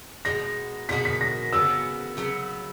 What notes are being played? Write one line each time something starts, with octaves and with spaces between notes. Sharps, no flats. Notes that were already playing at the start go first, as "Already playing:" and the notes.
B2 G#3 D#4 F#4 A#6
B2 G#3 D#4 F#4 B6
B6
A#6
C#3 F#3 B3 E6
C#3 F#3 B3